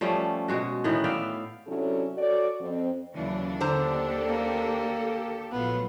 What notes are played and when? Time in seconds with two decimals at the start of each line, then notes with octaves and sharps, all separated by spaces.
0.01 F3 G3 A3 C#4
0.48 B2 G#3 F#4
0.84 A2 D#3 E3 B3
1.04 D5 E5 F5 G5
1.67 C3 F#3 C#4 D4 E4 A4
2.17 F#4 A4 C#5 D5
2.61 F2 C4
3.15 D#2 C#3 E3 F#3 D4
3.61 D3 G4 A4 C5 A#5
4.28 A#3
5.52 A#1 F#3 A3 B3 F4